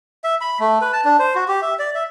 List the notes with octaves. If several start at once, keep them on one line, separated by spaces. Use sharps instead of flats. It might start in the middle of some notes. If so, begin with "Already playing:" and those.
E5
B5
A3
B4
A5
D4
C5
F#4
G4
E5
D5
E5